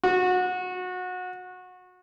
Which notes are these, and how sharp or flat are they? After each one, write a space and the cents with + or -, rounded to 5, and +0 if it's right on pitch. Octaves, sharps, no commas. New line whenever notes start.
F#4 -25